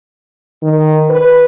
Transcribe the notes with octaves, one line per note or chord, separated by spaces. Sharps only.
D#3
B4